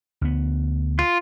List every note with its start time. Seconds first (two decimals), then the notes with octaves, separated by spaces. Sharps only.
0.21 D2 B3
0.99 F4